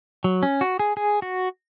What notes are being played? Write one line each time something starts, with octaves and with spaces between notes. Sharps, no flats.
F#3
C#4
F#4
G#4
G#4
F#4